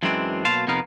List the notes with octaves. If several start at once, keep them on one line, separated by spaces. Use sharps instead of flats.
F#2 E3 F#3 G#3 C4 D4
B2 F#3 A#3 F5 A5 C6
F2 C3 B3 D#4 A#4 F5